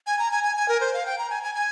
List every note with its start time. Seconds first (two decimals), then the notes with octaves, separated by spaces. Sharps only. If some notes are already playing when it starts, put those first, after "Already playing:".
0.07 G#5
0.19 A#5
0.31 G#5
0.44 G#5
0.56 G#5
0.69 A#4
0.80 C5
0.94 F5
1.06 G5
1.18 A#5
1.30 G#5
1.43 G#5
1.55 G#5